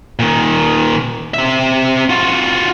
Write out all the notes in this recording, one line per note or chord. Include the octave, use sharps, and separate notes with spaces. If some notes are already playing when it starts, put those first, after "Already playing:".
A#2 D#3
C4 E5
F4 F#4